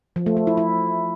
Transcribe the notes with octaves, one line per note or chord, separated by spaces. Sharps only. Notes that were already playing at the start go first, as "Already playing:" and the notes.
F3
A3
A3
E4
E4